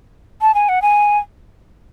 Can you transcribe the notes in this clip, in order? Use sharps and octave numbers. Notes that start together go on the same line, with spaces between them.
A5
G#5
F#5
G#5